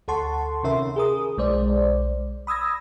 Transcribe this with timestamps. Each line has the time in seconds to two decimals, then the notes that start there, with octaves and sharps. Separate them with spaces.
0.08 D2 A4 F#5 A5 C6 C#6
0.63 C3 D#3 C#4 A#4 E5 C6
0.96 G#4 A#4 D#6
1.38 B1 G#3 C5 D5
2.47 B5 D#6 E6 G#6 A#6